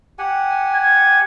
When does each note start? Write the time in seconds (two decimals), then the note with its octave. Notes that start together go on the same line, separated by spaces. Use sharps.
0.19 G4 F#5 G#5
0.74 G#6